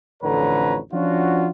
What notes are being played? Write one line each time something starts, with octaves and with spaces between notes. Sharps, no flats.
A1 F2 D3 B4 C#5 A#5
F3 C#4 D4 F4 F#4